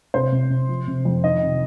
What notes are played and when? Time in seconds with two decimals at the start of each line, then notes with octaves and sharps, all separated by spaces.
0.14 C3 C5
0.32 C3
0.50 C3
0.69 F3
0.87 C3
1.05 F2
1.24 D#3 D#5
1.43 C3